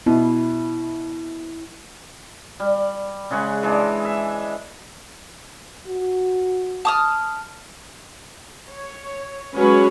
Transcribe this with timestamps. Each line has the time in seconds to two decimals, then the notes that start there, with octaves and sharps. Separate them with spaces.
0.06 B2 E4
2.60 G3
3.31 C#3 G#3 F#5 C#6
3.63 E3 G#3 D4
4.05 E5
5.87 F#4
6.85 A5 D#6 F6
8.68 C#5
9.55 F#3 G#3 C#4 F#4 B4 C#5